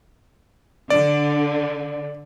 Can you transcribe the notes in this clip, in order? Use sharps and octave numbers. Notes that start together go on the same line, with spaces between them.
D3 D5